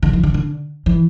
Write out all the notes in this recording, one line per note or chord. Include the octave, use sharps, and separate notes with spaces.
D3
E3
D3
D3
E3